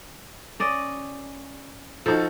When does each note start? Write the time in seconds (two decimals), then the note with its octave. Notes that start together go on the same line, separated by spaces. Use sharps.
0.60 C#4 D5 D#5
2.06 F3 D#4 F#4 A4